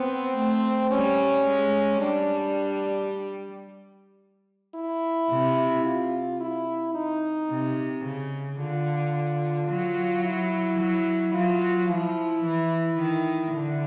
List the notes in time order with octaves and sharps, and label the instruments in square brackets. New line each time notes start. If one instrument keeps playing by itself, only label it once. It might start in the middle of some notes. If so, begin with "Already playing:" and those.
Already playing: [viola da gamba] B3 [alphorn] C4
[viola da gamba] A3
[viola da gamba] G3 [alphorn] C#4
[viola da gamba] G#3
[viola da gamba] G3 [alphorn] D4
[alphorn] E4
[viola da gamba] C3
[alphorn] F4
E4
D#4
[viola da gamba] C3
C#3
[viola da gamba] D3 [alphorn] F4
[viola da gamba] F#3
[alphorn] E4
[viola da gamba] F#3
[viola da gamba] F#3 [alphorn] F4
[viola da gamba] F3 [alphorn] E4
[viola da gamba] E3
D#3
[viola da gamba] D3 [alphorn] E4